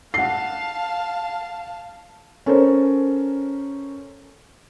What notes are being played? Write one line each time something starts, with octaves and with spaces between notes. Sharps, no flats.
F5 F#5 A5 C7
C#4 A4 A#4 C5